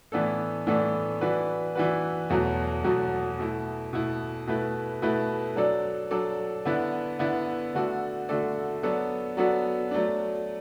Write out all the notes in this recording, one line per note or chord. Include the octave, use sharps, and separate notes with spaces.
A2 E3 B3 D4 A4
A2 E3 B3 D4 A4
E3 D4 F#4 B4
E3 D4 F#4 B4
E2 B2 F#3 A3 F#4
E2 B2 F#3 A3 F#4
B2 A3 E4
B2 A3 E4
B2 A3 E4 B4
B2 A3 E4 B4
F#3 D4 A4 D5
F#3 D4 A4 D5
D3 B3 E4 B4 D5
D3 B3 E4 B4 D5
D3 A3 F#4 A4 D5
D3 A3 F#4 A4 D5
F#3 B3 D4 F#4 A4
F#3 B3 D4 F#4 A4
F#3 A3 D4